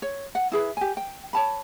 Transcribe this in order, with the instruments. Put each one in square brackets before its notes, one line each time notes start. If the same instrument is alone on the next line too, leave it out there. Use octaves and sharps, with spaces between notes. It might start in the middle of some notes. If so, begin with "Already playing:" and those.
[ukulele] C#5
F#5
E4 G#4 B4
G4 G#5
G5
C#5 A5 B5